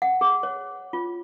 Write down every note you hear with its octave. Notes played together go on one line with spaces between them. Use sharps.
F#5
G#4
C#5
F4